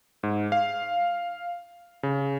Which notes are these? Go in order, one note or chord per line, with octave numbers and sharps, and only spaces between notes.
G#2
F5
C#3